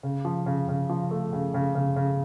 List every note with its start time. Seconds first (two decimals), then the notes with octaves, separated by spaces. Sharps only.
0.03 C#3
0.25 F3
0.46 C#3
0.68 C#3
0.89 F3
1.11 A3
1.33 C#3
1.54 C#3
1.75 C#3
1.96 C#3